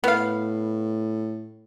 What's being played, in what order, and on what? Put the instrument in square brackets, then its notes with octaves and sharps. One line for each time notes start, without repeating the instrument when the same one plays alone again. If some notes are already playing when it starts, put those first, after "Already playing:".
[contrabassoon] A2 [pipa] B3 F5